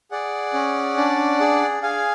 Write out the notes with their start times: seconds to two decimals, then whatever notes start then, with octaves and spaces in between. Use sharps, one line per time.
0.11 G#4 D5 F#5
0.54 C#4
0.97 D4
1.40 G#4
1.82 G#4 F5 G#5